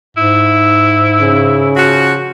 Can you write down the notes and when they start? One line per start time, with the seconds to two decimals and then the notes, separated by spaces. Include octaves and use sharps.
0.17 G#2 E4
1.20 C#3
1.76 F3 F#4